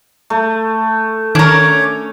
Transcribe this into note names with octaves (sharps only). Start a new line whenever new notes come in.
A3
D#3 C#4 D4 A#4 C#5 D6